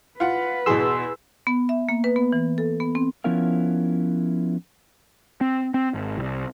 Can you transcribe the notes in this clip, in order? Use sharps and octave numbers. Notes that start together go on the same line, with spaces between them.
F4 B4 F#5
E2 B2 G#4 C6 E6
B3
E5
A#3
B4
B3
E3
A4
B3
C4
F3 B3 C#4 E4 A#4 F5
C4
C4
G#1
C2